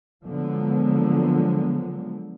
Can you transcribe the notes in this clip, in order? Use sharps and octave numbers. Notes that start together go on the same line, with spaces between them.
D3 F3 F#3 G#3 A#3 B3